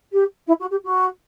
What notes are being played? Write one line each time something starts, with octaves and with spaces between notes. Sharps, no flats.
G4
E4
F#4
G4
F#4